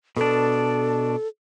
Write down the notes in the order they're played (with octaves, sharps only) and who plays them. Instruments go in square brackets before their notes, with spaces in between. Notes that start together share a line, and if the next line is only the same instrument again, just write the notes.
[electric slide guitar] B2 D4 [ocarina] A4